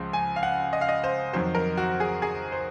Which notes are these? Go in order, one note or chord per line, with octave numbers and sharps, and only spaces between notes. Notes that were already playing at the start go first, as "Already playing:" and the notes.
Already playing: C#2 C#3 F3 G#3 C6
G#5
F5
F#5
D#5
F5
D#5
C5
F2 D#3 F#3 C5
A#4
F#4
G#4
G#4
C5